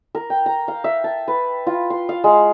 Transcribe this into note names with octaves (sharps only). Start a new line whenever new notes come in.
A#4
G5
A#5
F5
E5
A5
B4
F4
C6
F5
G#3